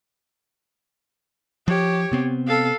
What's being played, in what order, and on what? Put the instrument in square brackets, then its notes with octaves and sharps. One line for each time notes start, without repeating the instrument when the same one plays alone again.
[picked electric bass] F3 [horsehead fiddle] G4 C#5
[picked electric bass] C3 B3 C4
[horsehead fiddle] A4 F5